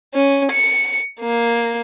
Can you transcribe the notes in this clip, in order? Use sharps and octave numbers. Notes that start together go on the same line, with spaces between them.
C#4
C#7
A#3